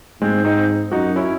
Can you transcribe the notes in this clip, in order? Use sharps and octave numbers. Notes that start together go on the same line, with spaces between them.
G#2 G#3 C4
C4 D#4
F#2 D#4 F#4
C#4 E4